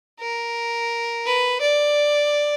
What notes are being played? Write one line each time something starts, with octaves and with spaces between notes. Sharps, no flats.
A#4
B4
D5